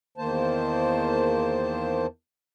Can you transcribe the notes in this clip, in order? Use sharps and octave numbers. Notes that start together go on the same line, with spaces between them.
E2 D#3 A#3 C5 A5